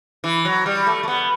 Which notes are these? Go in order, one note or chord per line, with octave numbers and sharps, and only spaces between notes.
E3
F#3
G3
A3
A3
B3